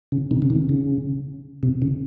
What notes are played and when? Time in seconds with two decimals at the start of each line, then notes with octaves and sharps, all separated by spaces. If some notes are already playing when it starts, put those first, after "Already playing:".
0.12 C#3
0.31 C3 D#3
0.42 C#3
0.50 C3 D#3
0.69 C#3
1.63 C3
1.82 C#3